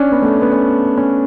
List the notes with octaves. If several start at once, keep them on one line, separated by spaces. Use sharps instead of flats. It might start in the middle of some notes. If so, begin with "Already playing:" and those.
Already playing: C#4 D4
B3
A3
B3
C#4
C#4